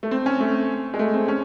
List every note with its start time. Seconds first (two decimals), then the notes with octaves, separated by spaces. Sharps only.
0.03 A3
0.11 C4
0.26 C#4
0.40 A3
0.94 G#3
0.99 A3
1.14 C4
1.28 C#4